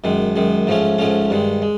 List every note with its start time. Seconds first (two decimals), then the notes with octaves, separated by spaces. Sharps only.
0.04 F#2 D#3 G#3
0.36 F#2 D#3 G#3
0.67 G#2 F3 A3 C#4
0.98 G#2 F3 A3 C#4
1.30 G2 D#3 G#3
1.62 G#3